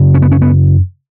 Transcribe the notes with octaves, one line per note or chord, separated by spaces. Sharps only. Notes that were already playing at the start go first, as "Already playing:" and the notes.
Already playing: F#2 C#3
C#4
B3
C#4
B3